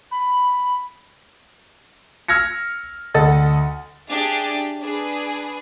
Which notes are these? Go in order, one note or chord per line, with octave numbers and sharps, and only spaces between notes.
B5
E6 F6 G#6 A#6 C#7
D2 A4 D#5 F#5 A6
D4 G4 G#4 E5 A6 D7
D4 G#4 B4